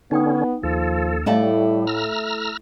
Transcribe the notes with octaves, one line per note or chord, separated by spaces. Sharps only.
D3 B3 C#4 D#4 G5 D#6
D#2 F3 A4
A2 G3 A3 C#4 E4 D#5 F5 A5
A#5 E6 F6